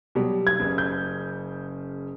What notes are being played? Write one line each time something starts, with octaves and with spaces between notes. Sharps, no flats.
B2 F#3 G3
G#6
F#1 C#3
G6